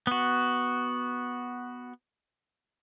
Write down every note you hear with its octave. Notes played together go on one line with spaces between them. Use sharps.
B3 F#4